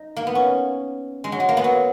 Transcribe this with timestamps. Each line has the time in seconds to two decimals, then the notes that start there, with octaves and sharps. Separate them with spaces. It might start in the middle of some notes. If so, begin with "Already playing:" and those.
Already playing: D#4
0.16 A#3
0.27 B3
0.35 C#4
1.24 G#3
1.32 F#3
1.40 G#3
1.49 A#3
1.57 B3
1.64 F#3